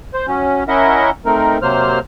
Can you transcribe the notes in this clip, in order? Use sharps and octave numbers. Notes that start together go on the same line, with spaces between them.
C5
F#3 C#4
C#4 E4 A#4 D#5 E5 F#5
A3 C4 D#4 A#4
C3 F#3 A#3 C5 F6